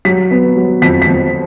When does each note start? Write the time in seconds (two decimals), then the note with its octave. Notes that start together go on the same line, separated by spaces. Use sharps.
0.05 F#3 B6
0.31 B3
0.56 F#3
0.82 F2 B6
1.02 B6
1.07 F2